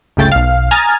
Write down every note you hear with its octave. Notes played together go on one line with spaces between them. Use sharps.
G1 C#2 C#3 A3 G5 A6
B1 F5
G#5 A#5 D#6 F6 G#6 A6